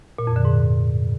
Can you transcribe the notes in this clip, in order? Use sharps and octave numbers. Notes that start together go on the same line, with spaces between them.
A#2
F2
D3
G#2